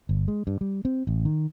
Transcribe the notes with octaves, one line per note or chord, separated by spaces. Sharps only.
G1
G#3
G2
G3
C4
A1
D#3